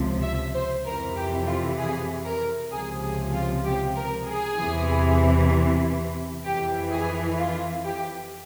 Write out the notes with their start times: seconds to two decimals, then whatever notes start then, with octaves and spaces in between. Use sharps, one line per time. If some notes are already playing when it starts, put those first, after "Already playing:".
Already playing: C#2 C3 F3
0.22 E5
0.54 C5
0.84 F2 C3 E3 A#4
1.16 G4
1.46 F4
1.77 G#4
2.25 A#4
2.71 C#2 C3 F3 G#4
3.03 G#4
3.33 F4
3.64 G4
3.96 A#4
4.27 G#4
4.59 E2 C3 E3
6.45 F2 E3 G4
6.91 G#4
7.37 F4
7.85 G4